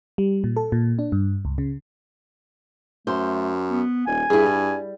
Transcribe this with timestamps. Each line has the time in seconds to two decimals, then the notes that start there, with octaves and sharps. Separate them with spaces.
0.18 G3
0.44 A#2
0.56 A4
0.72 A#2
0.99 D4
1.12 G2
1.45 C#2
1.58 C#3
3.07 F#2 A3 C5
3.69 B3
4.07 D#1 G#5
4.30 G2 E4 G#4
4.46 G3